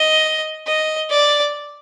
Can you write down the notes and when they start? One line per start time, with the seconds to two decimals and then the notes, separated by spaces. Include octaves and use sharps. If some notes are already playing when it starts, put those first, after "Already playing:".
Already playing: D#5
0.67 D#5
1.10 D5